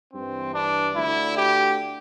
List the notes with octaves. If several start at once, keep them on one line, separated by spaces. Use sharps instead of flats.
G2 E3 C4
D4
D2 D3 E4
G4